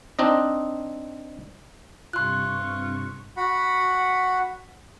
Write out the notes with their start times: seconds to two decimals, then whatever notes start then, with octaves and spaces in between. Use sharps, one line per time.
0.19 C4 D4 D#4 D#5
2.13 G2 C3 F4 C6 C#6 F#6
3.37 F#4 F#5 B5